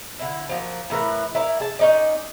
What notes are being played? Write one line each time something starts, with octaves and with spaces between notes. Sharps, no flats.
D3 E4
F3 F#3 A#3
A2 E3 A#4 B4
E4 A#4 D5
G#4 A5
C#4 D#4 D5